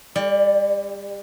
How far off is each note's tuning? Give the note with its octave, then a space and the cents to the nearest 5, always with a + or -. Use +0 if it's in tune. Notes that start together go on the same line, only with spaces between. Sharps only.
G3 +35 D5 +0